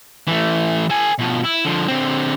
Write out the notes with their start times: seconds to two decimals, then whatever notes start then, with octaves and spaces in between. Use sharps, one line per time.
0.27 E3 A3
0.90 A4 G#5
1.19 B2 F3
1.45 E4
1.66 D3 F3
1.88 D3 C4